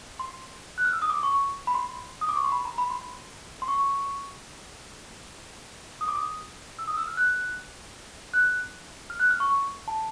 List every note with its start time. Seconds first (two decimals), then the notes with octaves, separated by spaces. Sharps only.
0.20 C6
0.78 F#6
0.85 F6
0.93 E6
1.02 D#6
1.10 D6
1.23 C#6
1.67 B5
1.75 C6
2.21 D#6
2.29 D6
2.36 C#6
2.44 C6
2.52 B5
2.65 A#5
2.78 B5
2.90 C6
3.62 C6
3.68 C#6
6.01 D#6
6.08 D6
6.16 D#6
6.79 E6
6.88 D#6
6.97 E6
7.07 F6
7.17 F#6
8.34 F#6
9.10 F6
9.20 F#6
9.30 F6
9.40 C#6
9.88 A5